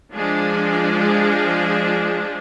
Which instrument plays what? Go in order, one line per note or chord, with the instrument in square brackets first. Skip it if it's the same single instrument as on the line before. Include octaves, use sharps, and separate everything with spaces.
[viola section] F3 G#3 D4 G#4